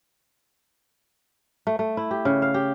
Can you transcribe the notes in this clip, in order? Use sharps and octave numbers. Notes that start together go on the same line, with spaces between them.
A3
A3
E4
G4
C#3
F5
G4